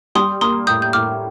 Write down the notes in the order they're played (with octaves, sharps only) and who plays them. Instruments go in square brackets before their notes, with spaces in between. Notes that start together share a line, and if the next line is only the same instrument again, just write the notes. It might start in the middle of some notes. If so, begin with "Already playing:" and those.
[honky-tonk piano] G3 [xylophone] C6 D#6
[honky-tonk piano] A#3 [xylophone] C6 D#6
[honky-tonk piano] A2 [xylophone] D#6 G6
[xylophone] G6
[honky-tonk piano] A2 [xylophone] D6 F6